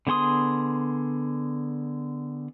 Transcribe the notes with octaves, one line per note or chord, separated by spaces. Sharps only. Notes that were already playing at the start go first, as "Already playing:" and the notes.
D3 B3 G#4 C6 D#6